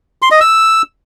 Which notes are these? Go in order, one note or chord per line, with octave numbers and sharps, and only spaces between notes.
C6
D#5
E6